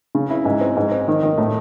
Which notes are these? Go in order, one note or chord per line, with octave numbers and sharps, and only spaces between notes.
C#3
E4
G#2
C4
G#2
C4
D#3
D#3
A2